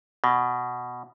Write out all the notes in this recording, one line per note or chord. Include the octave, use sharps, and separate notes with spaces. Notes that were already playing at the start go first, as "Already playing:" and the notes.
B2